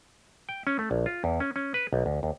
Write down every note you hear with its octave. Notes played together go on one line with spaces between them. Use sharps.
G5
C#4
A3
A#1
F4
E2
C#4
C#4
B4
B1
D2
D#2